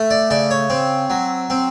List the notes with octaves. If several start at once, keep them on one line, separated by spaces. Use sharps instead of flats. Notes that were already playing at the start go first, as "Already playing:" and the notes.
Already playing: A3
D5
C#3 D5
C#5
C4
F#3
C4